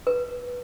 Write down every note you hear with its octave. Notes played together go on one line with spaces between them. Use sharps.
B4